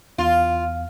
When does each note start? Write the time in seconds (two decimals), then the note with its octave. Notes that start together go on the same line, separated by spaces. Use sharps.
0.18 E2 F4